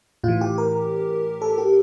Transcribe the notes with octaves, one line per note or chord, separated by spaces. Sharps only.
A2 E3 F4
G4
A#4
A4
G4